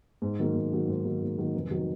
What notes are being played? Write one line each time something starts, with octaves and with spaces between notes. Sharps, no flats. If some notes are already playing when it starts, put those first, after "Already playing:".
G#2
D#3 F#3 A#3
G#2
D#3 F#3 A#3
G#2
D#3 F#3 A#3
G#2
D#3 F#3 A#3
F1
D#3 F#3